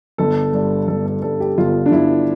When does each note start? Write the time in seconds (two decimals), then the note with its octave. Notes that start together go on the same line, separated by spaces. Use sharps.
0.18 G1 A4
0.53 G2
0.88 G1 A4
1.06 A4
1.22 G2 A4
1.40 G4
1.58 G1 F4
1.86 D4
1.92 G1 E4